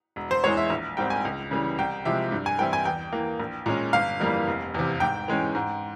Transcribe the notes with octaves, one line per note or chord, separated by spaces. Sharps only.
E1
C5
E2 E3 G#3 C#5
E5
A#1
G#2 G3 C4 G5
G#5
C#2
C#3 E3 G3
C2 G5
C3 F3 G#3 E5
G2
G#5
E3 G3 C4 E4 G5
G#5
E2 G5
E3 A#3
A#1
A#2 G#3 C#4
G1 F5
F2 E3 G3 A#3
F1
E2 C3
G#2 G5
E3 G#3 C#4
G#2